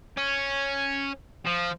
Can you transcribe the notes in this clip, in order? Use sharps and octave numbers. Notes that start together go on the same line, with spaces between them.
C#4
F3